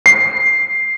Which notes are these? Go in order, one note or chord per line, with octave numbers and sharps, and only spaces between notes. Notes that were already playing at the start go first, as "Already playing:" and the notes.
C7